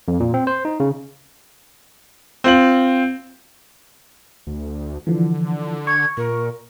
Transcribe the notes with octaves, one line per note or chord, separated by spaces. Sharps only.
F2
A#2
C4
C5
D#4
C#3
C4 F4 F#7
D2
D3 E3 F3
C#6 G#6
A#2 A#4